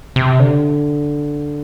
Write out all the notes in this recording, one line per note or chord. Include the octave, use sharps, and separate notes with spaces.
C3
D3